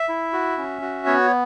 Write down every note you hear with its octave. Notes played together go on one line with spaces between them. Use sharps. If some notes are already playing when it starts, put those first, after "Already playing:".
Already playing: E5
E4
F#4
C#4
F#4
B3 C#5